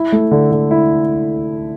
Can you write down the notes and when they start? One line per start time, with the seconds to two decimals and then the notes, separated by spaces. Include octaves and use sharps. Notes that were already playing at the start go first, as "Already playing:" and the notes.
Already playing: E4
0.12 A3
0.31 D3
0.52 D3
0.71 E4